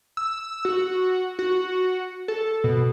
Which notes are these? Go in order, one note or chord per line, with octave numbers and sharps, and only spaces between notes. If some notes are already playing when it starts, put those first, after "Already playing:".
E6
F#4
F#4
A4
B2